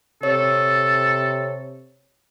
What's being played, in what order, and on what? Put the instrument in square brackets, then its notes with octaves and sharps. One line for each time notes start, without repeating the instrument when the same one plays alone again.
[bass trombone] C3 [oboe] A4 [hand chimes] C#5